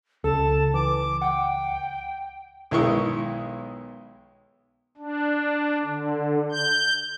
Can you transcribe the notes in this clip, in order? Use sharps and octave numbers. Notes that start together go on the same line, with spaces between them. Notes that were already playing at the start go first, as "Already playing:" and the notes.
C#2 A4 A5
E3 D6
F#5 G5
B1 D#3 G#3 E4 C#6
D4
D3
G6